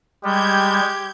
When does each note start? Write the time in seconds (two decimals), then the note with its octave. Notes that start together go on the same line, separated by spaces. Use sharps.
0.24 G3 G#3 G4 G6 G#6